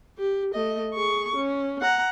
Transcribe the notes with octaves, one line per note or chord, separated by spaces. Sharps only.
G4
A3 D#5
G#4 C#6
C#4
F#5 A#5